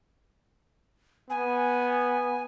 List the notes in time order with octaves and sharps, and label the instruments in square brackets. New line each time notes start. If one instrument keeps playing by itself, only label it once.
[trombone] B3 [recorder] G#5